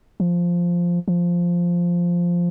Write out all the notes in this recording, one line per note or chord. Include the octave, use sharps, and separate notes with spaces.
F3
F3